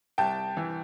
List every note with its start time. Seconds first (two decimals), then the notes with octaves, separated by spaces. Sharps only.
0.18 C2 G5 A5
0.57 E3